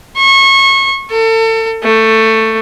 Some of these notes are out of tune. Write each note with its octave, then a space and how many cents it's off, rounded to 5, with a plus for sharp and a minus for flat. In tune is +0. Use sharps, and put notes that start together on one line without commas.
C#6 -30
A4 +35
A3 +15